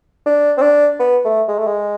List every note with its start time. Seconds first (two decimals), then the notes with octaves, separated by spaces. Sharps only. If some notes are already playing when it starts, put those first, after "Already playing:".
0.26 D4
0.57 C4
0.62 D4
1.00 B3
1.25 A3
1.48 G#3
1.59 A3
1.67 G#3